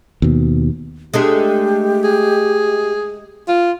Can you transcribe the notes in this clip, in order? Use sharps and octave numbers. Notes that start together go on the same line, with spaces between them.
D#2 B2
G#3 A3 D4 G4
G#4
F4